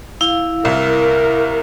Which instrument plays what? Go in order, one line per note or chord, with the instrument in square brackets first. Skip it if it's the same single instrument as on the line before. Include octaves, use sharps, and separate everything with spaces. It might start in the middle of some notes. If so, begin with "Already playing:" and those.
[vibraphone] E4 F5
[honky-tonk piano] C2 [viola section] A#4